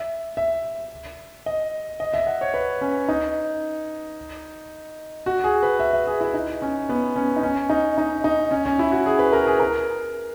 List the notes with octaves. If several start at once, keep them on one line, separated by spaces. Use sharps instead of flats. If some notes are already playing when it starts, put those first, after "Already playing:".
Already playing: E5
E5
D#5
D#5
E5
F#5
C#5
B4
C#4
D#4
F#4
G#4
B4
E5
E5
G#4
E4
D#4
C#4
B3
C#4
D#4
C#4
D#4
D#4
D#4
C#4
C#4
E4
F#4
G#4
B4
A#4
G#4
A#4